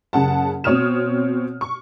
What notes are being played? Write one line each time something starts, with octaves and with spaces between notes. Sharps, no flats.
F#1 C#3 F#5 A5
B2 C4 C#5 D#6 F6 E7
C#6